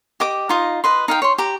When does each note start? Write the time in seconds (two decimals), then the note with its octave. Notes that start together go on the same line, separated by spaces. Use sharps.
0.20 G4 D#5 D6
0.49 D#4 F4 D#5
0.84 B4 D#5 C6
1.08 D#4 F5 G5
1.22 C#5 C6
1.38 G4 A#5